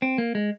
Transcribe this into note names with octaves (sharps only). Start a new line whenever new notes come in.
C4
A#3
G#3